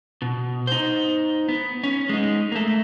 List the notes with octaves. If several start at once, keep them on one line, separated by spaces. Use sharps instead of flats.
B2
D#4 C5
B3
C#4
G#3 D#4
A3 A#3